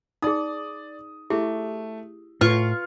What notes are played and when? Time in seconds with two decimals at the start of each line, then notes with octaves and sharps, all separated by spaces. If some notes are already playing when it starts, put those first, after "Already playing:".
0.22 D#4 G#4 D5 D#6
1.30 A3 E4 G4 G#4
2.41 A2 F4 B4 C#6 F6